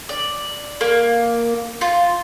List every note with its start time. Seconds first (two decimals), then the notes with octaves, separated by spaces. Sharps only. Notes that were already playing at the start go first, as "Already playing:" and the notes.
0.09 D5
0.81 A#3
1.81 F4